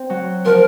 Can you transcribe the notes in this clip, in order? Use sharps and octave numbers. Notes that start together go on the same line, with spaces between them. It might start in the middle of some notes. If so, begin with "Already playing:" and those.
Already playing: C4
F#3
F3 A#4